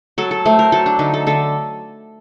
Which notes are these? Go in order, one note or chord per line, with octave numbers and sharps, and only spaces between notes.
F#3 A4
A4
A3 C5
A#4
F#3 A4
D4
D3 D#4
A4
D3 A4